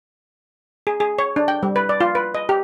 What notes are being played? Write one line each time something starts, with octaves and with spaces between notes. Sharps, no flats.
G#4
G#4
C#5
D4
G5
G3
B4
D5
F4
B4
D#5
G4